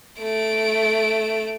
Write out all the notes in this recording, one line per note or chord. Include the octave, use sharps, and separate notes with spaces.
A3 D7